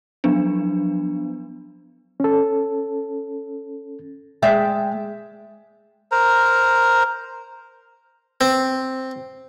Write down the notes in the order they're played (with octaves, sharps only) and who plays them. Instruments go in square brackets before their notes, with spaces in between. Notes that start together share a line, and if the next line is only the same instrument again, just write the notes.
[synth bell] F3 F#3 B3 D4
[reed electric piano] C#4 A4
[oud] G#3 D5 E5 [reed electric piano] G5
[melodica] A#4 C5 A#5
[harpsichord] C4